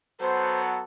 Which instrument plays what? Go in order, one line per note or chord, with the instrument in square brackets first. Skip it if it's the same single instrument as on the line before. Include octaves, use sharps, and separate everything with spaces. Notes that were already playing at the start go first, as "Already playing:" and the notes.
[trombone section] F#3 B3 A4 [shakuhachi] C5